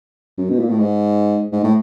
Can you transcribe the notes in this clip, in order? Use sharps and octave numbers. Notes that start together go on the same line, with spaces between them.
F#2
B2
A#2
A2
G#2
G#2
A2